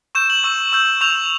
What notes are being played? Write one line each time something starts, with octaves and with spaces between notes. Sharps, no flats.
C#6 E6 G6 E7
F#7
C#6 E6 G6
C#6 E6 G6
C#6 E6 G6 F7